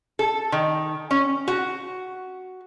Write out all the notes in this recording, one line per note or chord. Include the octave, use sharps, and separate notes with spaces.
A4
D#3
C#4
F#4